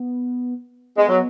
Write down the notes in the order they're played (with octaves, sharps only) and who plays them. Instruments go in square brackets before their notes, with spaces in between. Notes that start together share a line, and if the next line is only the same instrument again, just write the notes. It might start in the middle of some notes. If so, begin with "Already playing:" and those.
Already playing: [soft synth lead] B3
[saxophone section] G#3 [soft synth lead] B3
[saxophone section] F#3